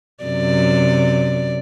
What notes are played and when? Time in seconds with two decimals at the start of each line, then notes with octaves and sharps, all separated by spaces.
0.24 F#2 C3 D5